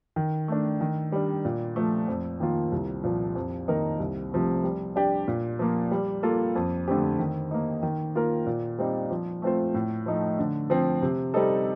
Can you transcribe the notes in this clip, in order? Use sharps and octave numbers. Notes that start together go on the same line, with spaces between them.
D#3
A3 D4
D#3
G3 D4
A#2
F3 A3
F2
D#3 A#3 F4
C2
A#2 F3
F2
D#3 A#3 D#4 A#4
C2
C3 F3 A3
G3
D4 G4 D5
A#2
F3 A#3
G3
A#3 F4 A4
F2
D3 A3 C4 G4
D#3
A#3 D#4
D#3
A#3 F4 A#4
A#2
G3 C4 D#4
F3
A3 C4 F4 C5
A2
F3 A3 D#4
D3
F3 C4
C3
G3 C4 D#4 A4